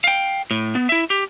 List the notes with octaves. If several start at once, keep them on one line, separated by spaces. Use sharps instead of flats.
F5 G5
A2
B3
E4 E5
G4